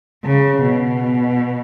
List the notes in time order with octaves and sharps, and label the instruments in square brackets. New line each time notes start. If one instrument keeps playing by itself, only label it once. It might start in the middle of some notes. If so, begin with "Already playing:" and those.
[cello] C#3
B2